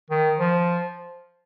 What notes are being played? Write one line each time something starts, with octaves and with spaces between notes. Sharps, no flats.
D#3
F3